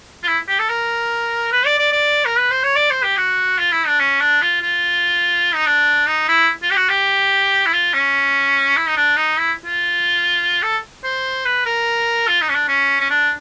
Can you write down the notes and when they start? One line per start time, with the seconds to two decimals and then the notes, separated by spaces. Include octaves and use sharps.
0.23 F4
0.27 E4
0.48 G4
0.59 A4
0.70 A#4
1.52 B4
1.66 D5
1.79 D5
1.93 D5
2.25 A#4
2.38 B4
2.51 C5
2.63 C#5
2.76 D5
2.90 C5
3.03 G4
3.17 F#4
3.58 F4
3.72 E4
3.87 D4
4.00 C#4
4.21 D4
4.42 F4
4.62 F4
5.54 D#4
5.66 D4
6.07 D#4
6.28 E4
6.63 F4
6.70 G4
6.76 F#4
6.89 G4
7.66 E4
7.73 F4
7.94 C#4
8.77 E4
8.87 D#4
8.97 D4
9.17 D#4
9.37 E4
9.65 F4
10.63 A4
11.04 C5
11.45 B4
11.66 A#4
12.28 F4
12.41 D#4
12.50 C#4
12.55 D4
12.68 C#4
13.00 C#4
13.10 D4